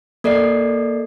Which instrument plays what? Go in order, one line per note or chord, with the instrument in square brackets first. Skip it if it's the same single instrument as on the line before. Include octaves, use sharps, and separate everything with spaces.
[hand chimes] A#3 A4 D5 D#5 C7